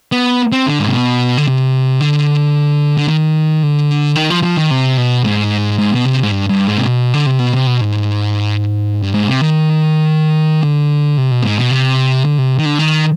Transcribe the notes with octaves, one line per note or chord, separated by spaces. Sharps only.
B3
C4
D3
G#2
C3
B2
D3
C3
D3
D3
D#3
D3
D#3
F3
F3
D#3
C3
B2
G#2
G#2
B2
C3
G#2
G2
G2
G#2
C3
B2
D3
C3
B2
C3
B2
G#2
G2
G#2
C3
D#3
D3
C3
B2
G#2
B2
C3
D3
C3
D#3
D3
D#3